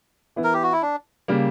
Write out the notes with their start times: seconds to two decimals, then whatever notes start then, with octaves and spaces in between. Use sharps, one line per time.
0.36 E3 B3 E4
0.44 A#4
0.53 G4
0.63 F#4
0.72 E4
0.82 D4
1.28 C#3 G3 A#3